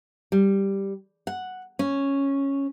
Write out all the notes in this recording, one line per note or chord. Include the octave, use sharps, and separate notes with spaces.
G3
F#5
C#4